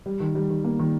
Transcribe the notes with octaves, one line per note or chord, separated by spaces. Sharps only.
G3
D#3
G3
D#3
A#3
D#3